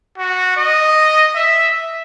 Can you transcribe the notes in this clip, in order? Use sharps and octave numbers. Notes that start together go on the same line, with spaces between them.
F#4
D#5
E5